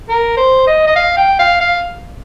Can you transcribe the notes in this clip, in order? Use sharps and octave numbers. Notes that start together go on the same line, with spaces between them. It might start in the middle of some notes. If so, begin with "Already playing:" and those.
A#4
C5
D#5
D#5
F5
G5
F5
F5